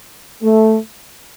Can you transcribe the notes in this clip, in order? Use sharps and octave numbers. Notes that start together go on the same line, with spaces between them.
A3